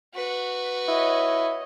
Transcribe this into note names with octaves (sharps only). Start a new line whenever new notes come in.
F#4 B4
E4 C#5 D#5